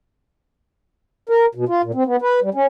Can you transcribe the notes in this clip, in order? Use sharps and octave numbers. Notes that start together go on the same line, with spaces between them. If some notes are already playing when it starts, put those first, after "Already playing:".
A#4
B2
F4
A#2
C4
B3
B4
G3
C#4